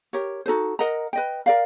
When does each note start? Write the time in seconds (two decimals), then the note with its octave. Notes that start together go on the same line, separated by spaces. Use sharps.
0.13 G4 A#4 C#5
0.46 D#4 F#4 A4 C5
0.79 A#4 D#5 F#5 A#5
1.13 B4 D#5 G5
1.46 A#4 D5 F5